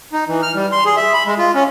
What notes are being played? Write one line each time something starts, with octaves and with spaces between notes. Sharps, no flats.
D#4
E3
F6
G3
C6
G#4
E5
B5
G#3
F4
C#4